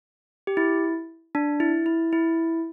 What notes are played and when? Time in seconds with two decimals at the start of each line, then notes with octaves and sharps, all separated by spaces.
0.47 G4
0.57 E4
1.35 D4
1.60 E4
1.86 E4
2.13 E4